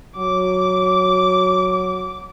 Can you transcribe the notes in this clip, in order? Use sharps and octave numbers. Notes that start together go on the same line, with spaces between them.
F#3 D6